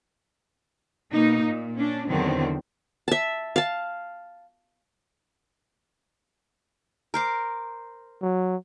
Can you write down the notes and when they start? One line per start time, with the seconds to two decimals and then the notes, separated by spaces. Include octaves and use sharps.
1.11 B2 A#3 D#4
1.45 A#2
1.75 C#4 D4
2.08 E2 D3 D#3 F#3 C4
3.08 E5 A5
3.56 F5 A5
7.14 A#4 C5 D6
8.22 F#3